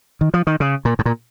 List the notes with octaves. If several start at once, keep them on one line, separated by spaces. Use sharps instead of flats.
D#3
F3
D#3
C#3
A#2
G#2
A#2